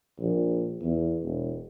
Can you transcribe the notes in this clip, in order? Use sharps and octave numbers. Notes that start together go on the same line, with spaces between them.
A#1
E2
E1